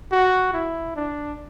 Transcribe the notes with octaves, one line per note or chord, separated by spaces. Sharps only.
F#4
E4
D4